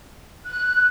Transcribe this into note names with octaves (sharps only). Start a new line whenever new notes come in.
F#6